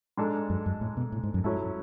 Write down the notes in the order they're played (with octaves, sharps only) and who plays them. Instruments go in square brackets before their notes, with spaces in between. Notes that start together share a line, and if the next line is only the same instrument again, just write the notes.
[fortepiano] G#2 G#3 D4 A4
[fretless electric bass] F#2
F#2
A2
B2
A2
G#2
F#2
[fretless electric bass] G#2 [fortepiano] F#3 C#4 E4 A4